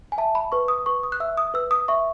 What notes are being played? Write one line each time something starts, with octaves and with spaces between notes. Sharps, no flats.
G#5
E5 A5
B5
B4 C#6
D#6
B4 C#6
D#6
F#6
E5 E6
D#6
B4 E6
D#6
E5 C#6